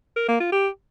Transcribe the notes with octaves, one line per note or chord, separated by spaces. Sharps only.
A#4
A#3
F4
G4